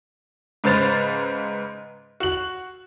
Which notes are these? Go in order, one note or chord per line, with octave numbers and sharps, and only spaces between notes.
G#2 C#3 B4 C5 A6 F7
F#4 F#7